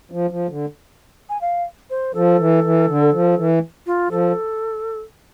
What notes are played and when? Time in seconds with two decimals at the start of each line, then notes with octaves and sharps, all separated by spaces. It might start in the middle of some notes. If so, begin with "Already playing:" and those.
0.12 F3
0.30 F3
0.49 D3
1.29 G#5
1.41 F5
1.90 C5
2.14 F3 A4
2.39 E3
2.64 E3
2.88 D3
3.13 F3
3.37 E3
3.86 F4
4.10 F3 A4